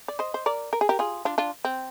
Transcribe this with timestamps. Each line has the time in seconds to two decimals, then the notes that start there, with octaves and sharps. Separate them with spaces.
0.08 D5
0.19 C5 D#5
0.34 C5
0.46 A#4 D5
0.73 A#4
0.81 G#4
0.89 G4 A#4
0.99 F4 G#4
1.25 D4 F4
1.38 D4 F4
1.65 C4